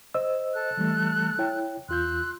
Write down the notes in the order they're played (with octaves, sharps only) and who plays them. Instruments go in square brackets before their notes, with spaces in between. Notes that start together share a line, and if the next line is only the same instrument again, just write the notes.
[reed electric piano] C5 D#5 E6
[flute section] A4 F#6
[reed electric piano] E3 G3 A3
E4 C#5 G5
[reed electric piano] E2 F4 G6 [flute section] C6 E6 F#6